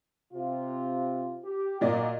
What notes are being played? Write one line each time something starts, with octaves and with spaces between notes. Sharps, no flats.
C3 F4
G4
A#2 A#3 F#4 D5 D#5